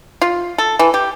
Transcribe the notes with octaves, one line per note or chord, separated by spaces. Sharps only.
F4
A4
E3
G4